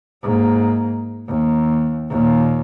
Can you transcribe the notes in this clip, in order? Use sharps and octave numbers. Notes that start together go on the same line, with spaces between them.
G#2 A#3
D#2
D#2 A#2